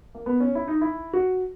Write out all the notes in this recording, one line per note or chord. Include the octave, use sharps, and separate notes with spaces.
A#3
B3
C#4
E4
D#4
E4
F#4